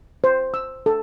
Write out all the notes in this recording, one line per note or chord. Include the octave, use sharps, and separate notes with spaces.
C5
E6
A4